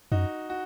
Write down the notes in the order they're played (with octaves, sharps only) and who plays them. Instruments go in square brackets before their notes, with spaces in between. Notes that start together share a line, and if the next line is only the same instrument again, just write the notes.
[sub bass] F#2 [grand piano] D#4 F#4
[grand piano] F#4